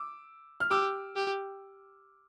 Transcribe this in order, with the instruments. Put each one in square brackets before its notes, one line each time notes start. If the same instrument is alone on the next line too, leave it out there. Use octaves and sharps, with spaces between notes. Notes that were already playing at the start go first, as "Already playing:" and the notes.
Already playing: [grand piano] D6 E6
F6
[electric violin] G4 [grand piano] D6 E6
[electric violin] G4